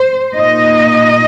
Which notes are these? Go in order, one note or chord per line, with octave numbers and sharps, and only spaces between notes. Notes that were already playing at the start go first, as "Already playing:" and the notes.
Already playing: C5
A#2 A#3 D#4 D#5